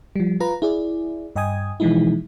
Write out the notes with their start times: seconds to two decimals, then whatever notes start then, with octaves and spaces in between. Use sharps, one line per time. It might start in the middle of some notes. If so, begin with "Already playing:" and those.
0.16 F3 G3
0.40 F4 B4 A#5
0.62 E4 G#4 D5
1.36 G2 D#5 G5 G#5 D#6 G#6
1.80 B2 E3 F3 G#3 D#4 E4